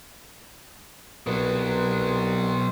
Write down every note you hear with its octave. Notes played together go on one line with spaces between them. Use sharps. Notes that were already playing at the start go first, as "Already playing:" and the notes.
C2 B2 F#3 B4